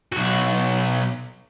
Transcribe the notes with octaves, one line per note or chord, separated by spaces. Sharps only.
B1 F#4